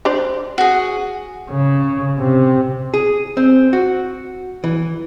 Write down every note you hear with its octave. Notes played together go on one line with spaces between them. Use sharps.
D4 C5 D5
F#4 G#4
C#3
C3
G#4
C4
F#4
E3